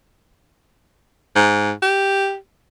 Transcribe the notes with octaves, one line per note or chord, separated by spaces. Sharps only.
G#2
G4